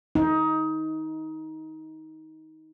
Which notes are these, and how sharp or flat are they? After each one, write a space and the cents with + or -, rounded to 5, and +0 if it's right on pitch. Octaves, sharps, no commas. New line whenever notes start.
D#4 +20